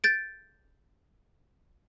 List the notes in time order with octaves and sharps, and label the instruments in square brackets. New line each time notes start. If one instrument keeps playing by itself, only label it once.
[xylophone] G6 A6 D7